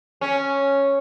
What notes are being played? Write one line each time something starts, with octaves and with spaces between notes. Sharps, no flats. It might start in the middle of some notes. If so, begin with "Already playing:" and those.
C#4